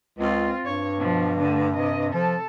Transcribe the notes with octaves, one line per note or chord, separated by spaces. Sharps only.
C#2 C4 F4
G2 C#5
B2 F3
D3 A3
C3 D#5
F3 A4